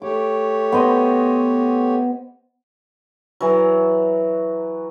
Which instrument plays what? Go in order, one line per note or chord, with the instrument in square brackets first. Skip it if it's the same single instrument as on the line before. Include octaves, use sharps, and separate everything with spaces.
[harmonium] A3 G4 C#5 [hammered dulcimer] D6
[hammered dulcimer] B3 C5 D#5
E3 F#3